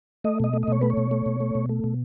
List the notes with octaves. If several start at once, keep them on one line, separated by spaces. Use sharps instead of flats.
A3 D#5
B2 D#5
A3
D#5
B2 C#5
A3 B4
C#5
B2
A3
B2
A3
B2
A3
B2